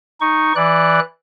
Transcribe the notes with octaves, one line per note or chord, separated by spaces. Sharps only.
D#4 C#6
E3 D5 F#6